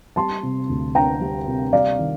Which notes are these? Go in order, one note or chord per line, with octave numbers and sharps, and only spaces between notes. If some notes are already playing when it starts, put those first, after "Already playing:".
G3 A5 C6
C3
D2
D4 G5 A#5
G3
C3
G3 D5 F5
D#3